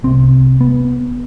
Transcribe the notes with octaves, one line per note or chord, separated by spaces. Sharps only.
C2 C3 C4
B3